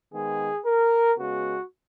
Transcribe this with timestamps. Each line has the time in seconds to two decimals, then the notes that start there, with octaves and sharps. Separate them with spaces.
0.12 D#3 G#3 B3 G#4
0.66 A#4
1.18 C#3 G#3 B3 F#4